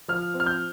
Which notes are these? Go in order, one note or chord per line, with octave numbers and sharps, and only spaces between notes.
F3 F6
C4
F6
G6